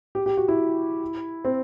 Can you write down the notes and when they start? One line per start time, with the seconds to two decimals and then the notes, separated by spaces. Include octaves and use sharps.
0.15 G4
0.26 G4
0.37 F#4
0.48 E4
1.45 C4